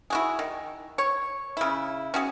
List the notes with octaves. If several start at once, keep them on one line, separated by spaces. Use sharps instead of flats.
E4 F#4 G#4
D#3
C#5
C#3 E4
C#4 F#4 G#4